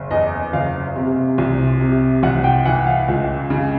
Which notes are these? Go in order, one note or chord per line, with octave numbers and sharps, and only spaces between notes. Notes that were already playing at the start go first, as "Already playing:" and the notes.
Already playing: F#1
E2 D#5
F#1 F5
C3
C2
C3
C2 F#5
G5
E3 F#5
F5
C#2
C#3